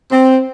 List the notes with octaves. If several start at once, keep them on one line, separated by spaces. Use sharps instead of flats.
C4